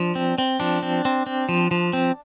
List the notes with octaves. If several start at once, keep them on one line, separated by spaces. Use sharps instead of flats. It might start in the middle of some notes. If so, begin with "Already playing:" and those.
Already playing: F3 D4
C4
C4
F3 D4
C4
C4
C4
F3
F3
C4